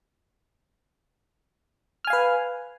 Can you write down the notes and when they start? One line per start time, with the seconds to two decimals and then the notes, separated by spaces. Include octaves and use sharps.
2.05 F6
2.07 G#5
2.10 F5
2.13 B4